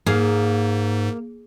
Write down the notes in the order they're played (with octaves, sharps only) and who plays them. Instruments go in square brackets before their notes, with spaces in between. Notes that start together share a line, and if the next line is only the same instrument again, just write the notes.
[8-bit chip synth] G#2 [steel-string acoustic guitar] A#3 [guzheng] G#4 F5